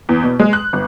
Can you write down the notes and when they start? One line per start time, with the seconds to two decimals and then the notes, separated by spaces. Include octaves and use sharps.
0.09 E2
0.23 B2
0.40 G#3
0.53 F#6
0.73 G1